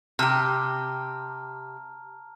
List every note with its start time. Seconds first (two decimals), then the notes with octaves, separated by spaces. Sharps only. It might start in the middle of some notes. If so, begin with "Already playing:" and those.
0.19 C3 G4 A5 A#5 F6